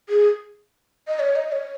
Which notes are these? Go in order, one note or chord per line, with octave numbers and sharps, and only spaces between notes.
G#4
D#5
C#5
D#5
C#5